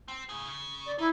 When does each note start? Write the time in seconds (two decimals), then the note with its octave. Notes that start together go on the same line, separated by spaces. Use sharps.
0.08 C4
0.29 A2 G#4
0.46 C#3
0.86 D5
0.99 D#4 E4